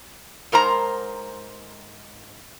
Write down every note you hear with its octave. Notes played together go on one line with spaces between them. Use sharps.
G#2 A#4 C5 A#5